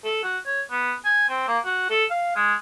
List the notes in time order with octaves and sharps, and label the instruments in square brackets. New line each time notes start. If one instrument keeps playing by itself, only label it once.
[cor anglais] A4
F#4
C#5
B3
G#5
C4
A#3
F#4
A4
F5
G#3